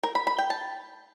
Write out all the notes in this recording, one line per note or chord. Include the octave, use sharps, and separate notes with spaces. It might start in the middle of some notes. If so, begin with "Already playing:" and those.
A#4
B5
B5
G5
A5